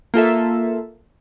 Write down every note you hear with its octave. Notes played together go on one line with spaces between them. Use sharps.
A#3 F4 A4 E5